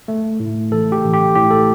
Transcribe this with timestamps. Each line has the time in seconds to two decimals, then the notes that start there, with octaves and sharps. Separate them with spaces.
0.08 A3
0.40 A2
0.71 A1 A4
0.92 G4
1.04 A1
1.13 G4
1.35 A2 G4
1.51 A4